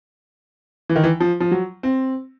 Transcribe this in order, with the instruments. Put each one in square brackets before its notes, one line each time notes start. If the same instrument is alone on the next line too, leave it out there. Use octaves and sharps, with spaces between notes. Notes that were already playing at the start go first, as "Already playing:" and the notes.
[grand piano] E3
D#3
E3
F3
F3
F#3
C4